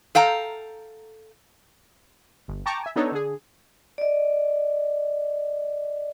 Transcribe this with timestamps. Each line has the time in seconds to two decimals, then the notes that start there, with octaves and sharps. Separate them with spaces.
0.15 A4 F5 G5 A#5
2.48 G1
2.66 G5 A5 A#5 C#6 D6
2.83 E5 G#5
2.96 B3 D4 D#4 A4 C#5
3.12 D3 G#4
3.98 D5 D#5